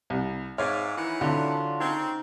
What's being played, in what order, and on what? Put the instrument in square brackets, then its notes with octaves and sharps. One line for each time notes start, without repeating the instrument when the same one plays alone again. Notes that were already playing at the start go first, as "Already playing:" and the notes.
[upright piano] C2
[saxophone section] G#2 [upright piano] C#5 [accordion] E5 G#5 [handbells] F5 D6 F6
[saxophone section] D#3 E3 F#5 [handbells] E4
[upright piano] D3 [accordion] F#3 D4 F4
[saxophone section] C#3 C4 [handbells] D#4